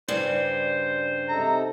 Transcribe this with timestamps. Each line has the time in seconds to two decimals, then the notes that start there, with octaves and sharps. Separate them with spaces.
0.08 G2 C#3 G3 C5
1.29 C3 D#4 A4 A#5